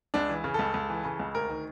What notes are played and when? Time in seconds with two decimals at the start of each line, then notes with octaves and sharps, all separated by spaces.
0.14 C#2 D4
0.29 E3
0.44 C#3
0.54 C#2 A4
0.74 C#2
0.90 E3
1.05 C#3
1.19 C#2
1.35 D2 A#4
1.50 D#3